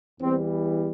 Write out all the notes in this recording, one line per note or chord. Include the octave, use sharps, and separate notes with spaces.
E2 E3 G3 C4